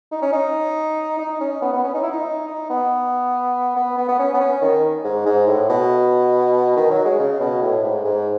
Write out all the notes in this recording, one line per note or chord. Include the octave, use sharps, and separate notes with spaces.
D#4
C#4
D#4
D#4
C#4
B3
B3
C#4
D#4
E4
D#4
D#4
B3
B3
B3
B3
C#4
B3
C#4
D#3
G#2
G#2
A2
B2
D#3
F#3
G#3
C#3
B2
A2
G#2
G#2